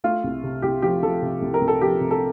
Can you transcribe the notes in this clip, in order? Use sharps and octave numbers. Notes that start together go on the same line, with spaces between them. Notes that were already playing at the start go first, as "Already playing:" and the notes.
A3 F4
C2
C3
C2 G4
F3 G4
F3 A4
C3
C2
A#4
C2
A4
F3 G4
C3
A4